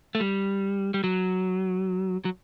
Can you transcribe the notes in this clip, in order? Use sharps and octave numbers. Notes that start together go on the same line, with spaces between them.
A3
G3
G3
F#3
F#3